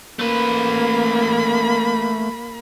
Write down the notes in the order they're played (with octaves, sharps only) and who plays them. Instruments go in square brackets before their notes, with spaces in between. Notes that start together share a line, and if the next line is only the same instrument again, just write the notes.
[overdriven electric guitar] A3 B4 [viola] A#3 B5